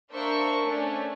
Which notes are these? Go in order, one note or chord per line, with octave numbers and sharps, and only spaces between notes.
A#3 D4 A#4 C5 E5 C#6
A3 C#4 D4